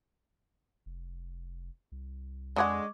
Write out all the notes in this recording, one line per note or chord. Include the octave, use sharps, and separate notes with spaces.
F1
C2
F2 D3 G#3 D4 F#5 C#6 D6 G#6